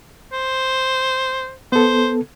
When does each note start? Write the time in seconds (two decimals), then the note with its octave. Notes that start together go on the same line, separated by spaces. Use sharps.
0.33 C5
1.72 B3 A4 C5